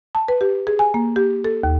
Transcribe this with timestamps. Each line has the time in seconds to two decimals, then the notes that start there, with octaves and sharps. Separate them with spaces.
0.15 A5
0.28 B4
0.41 G4
0.67 G#4
0.79 G#5
0.94 A#3
1.16 G4
1.44 A4
1.63 D#2